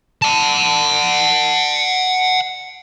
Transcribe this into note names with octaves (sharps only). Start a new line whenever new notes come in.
F#5 A5